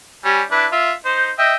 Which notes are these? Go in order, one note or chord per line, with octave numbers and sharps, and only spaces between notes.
G3 C#4 G#5
D4 E4 B4
F4 E5
D#4 C5
D#5 E5 G5